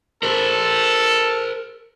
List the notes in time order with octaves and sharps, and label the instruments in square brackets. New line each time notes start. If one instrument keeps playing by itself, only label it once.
[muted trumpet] A4 [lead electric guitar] A#4 C5